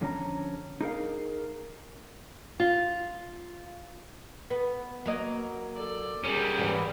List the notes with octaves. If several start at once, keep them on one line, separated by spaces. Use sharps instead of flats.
F2 D3 C#4 E4 A#5
D#4 G#4 A#4 F5
F4
B3
F#3 A#3 D#5
A4 D5
G3 C#4 G#4 A#4
G#2 D3 E3